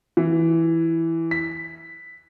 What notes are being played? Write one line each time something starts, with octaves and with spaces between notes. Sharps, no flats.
E3
B6